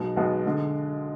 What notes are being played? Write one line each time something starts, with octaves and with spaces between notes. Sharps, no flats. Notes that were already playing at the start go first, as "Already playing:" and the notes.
Already playing: B1 B2 G#3 B3
B1 B2 G#3 B3
D3 G#3